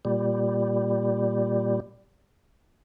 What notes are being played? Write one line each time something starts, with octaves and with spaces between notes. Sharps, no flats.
A#2 G3